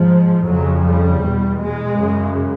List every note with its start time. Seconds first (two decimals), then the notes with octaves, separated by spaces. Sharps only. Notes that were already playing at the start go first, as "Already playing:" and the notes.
Already playing: G#2 F3
0.46 F2 C#3 F#3
0.84 G3
1.20 E2 B2
1.58 G#3
1.95 F#2 C#3